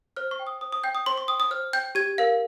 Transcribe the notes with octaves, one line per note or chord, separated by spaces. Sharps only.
C5 F6
C#6
G5
D#6
C5 D#6
D#6
G5 G6
D#6
C5 C6
C#6
G5 D#6
D#6
C5 F6
G5 G6
G4 G#6
A#4 F5